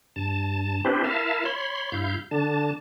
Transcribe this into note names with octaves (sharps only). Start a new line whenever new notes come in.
G2 A5
C4 D4 E4 G4 B4 C5
E4 A#4 E5 F5 A5
C#5 B5 C6
G2 E4 F5 G6
D3 D4 A5